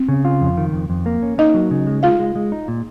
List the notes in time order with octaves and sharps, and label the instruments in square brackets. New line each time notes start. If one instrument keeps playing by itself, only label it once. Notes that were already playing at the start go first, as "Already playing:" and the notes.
Already playing: [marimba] C4
[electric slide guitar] C#3
F4
F2
D#3
F2
F2
A#3
C#4
[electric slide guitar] A#3 [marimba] D#4 D#5
[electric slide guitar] F#3
C#3
G#3
[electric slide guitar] G#3 [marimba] F4 F5
[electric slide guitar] G#3
G#3
D#4
A#2